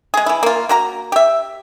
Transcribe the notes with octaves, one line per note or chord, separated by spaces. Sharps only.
G#3 G#4
E3 E4
A#3 F4
A#3 F#4 A#5
G4 E5